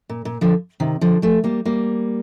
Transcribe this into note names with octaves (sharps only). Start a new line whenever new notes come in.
A#2
A#2
D3 F3
C3 D#3
D3 F3
F3 A3
G3 A#3
G3 A#3